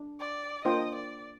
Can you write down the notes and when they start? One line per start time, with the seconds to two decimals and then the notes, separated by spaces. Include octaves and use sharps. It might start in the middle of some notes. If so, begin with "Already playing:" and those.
Already playing: D4
0.20 D5
0.65 A#3 D4 F4 C5 D#5 G5
0.95 D5